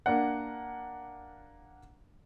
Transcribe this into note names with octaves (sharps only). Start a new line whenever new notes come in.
A#3 D4 F#5